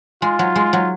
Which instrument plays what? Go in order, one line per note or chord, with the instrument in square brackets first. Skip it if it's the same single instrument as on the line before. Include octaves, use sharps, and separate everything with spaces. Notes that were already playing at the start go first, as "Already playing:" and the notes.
[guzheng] G#3 [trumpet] F4
[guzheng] F#3
G#3
F#3